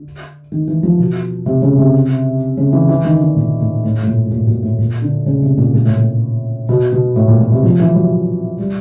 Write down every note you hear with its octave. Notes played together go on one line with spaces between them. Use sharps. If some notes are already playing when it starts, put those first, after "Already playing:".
Already playing: D3
D#3
E3
F3
B2
C3
C#3
C3
C#3
E3
E3
D#3
D3
A#2
A2
A2
A2
A#2
A2
A#2
B2
A#2
A2
A#2
D3
C#3
C3
A#2
A#2
A2
A#2
B2
B2
A2
A#2
A#2
C3
F3
E3
F#3
G3